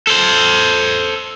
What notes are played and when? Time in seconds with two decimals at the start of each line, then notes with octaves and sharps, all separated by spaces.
0.07 A4 C5